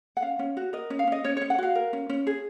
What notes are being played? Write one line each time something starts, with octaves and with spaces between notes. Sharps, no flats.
F#5
C#4 F5
C#4
F#4
A#4 D#5
C#4
F5
C#4 D#5
C#4 C#5
C#4 C#5
F#5
F#4 F5
A#4
C#4
C#4
G#4